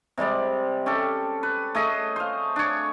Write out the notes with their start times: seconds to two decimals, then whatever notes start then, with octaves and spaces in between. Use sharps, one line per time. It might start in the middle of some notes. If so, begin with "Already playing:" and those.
0.18 C3 G3 G#3 D5
0.86 C#4 G4 A4
1.43 B4
1.75 A3 G#4 D#5
2.16 C5 F5
2.56 D4 C#5